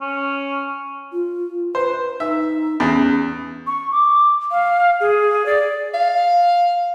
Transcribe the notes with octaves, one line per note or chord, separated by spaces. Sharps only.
C#4
F4
B4 C5
D#4 E5
E2 C#4
C#6
D6
F5
G#4
D5
F5